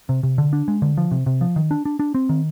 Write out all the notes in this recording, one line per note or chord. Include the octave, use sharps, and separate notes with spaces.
C3
C3
D3
D4
G#3
D3
F3
C3
C3
F3
D#3
D4
D4
D4
C4
D#3